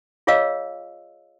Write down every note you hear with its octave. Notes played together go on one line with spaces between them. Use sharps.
F4 G#4 C#5 D#5 F5 E6